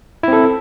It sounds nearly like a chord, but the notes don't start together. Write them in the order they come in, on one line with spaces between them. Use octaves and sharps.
E4 C4 A4